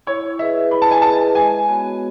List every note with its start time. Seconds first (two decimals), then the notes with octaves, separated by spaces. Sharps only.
0.07 E4 C#5
0.39 G#4 B4 D#5 E5
0.71 E4 B5
0.82 A5
0.91 G#5
1.02 G#4 B4 D#5 A5
1.35 G#3 G#5
1.68 B3 F#4 C#5